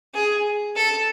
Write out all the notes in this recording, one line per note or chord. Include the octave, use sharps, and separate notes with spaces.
G#4
A4